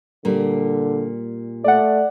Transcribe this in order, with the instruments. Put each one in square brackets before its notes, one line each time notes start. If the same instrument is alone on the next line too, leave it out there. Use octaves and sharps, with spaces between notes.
[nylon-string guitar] A#2 G3 [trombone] D3
[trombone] A3 [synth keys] D5 F#5